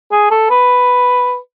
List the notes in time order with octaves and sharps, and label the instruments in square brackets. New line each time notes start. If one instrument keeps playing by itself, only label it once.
[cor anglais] G#4
A4
B4